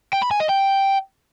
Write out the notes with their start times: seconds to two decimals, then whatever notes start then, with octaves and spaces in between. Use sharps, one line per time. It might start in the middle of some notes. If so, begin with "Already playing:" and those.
0.13 G5
0.22 B5
0.31 G#5
0.40 D#5
0.49 G5